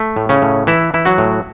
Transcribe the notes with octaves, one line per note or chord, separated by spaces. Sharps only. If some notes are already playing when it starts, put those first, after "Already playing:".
Already playing: A3
A2
C#3 C#4
A2
E3 E4
E3 E4
F#3 F#4
A2